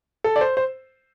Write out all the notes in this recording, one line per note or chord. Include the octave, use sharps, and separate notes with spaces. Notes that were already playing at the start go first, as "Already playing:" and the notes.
A4
D5
C5
C5